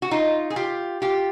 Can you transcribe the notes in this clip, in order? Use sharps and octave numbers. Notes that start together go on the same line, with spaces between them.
F#4
D#4 F4
G#4
F4 G4
F4 G4